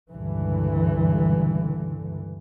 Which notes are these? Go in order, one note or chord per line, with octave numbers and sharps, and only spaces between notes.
C#2 G2 A#2 D3 E3